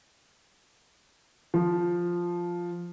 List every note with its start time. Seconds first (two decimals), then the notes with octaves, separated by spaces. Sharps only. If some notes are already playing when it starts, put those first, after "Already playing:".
1.54 F3